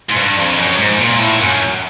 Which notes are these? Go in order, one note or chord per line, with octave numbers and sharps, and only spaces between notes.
G#2
G2
F2
F#2
G#2
A#2
A2
F#2